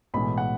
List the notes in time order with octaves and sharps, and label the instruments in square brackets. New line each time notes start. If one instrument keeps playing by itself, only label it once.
[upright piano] B1 A2 E3 G#3 B5
F#5